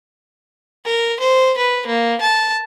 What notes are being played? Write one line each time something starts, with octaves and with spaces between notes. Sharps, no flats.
A#4
C5
B4
A#3
A5